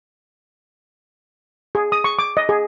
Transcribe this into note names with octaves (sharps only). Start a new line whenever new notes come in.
G#4
D#6
C#6
D6
D#5
G#4